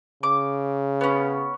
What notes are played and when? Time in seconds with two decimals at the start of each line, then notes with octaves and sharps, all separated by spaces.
0.23 C#3 D6
1.01 B3 C#4